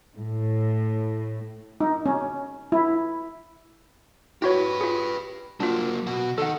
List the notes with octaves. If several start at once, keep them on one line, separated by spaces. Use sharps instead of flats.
A2
D#4
C#4
E4
E4 F#4 G4 B4 C#5
F4 G#4
F#3 A#3 D4 F4
B2 F#4
D#3 A4 F#5